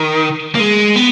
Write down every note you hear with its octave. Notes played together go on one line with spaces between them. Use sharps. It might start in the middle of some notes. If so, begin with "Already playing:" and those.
Already playing: D#3
A#3
G#3
B3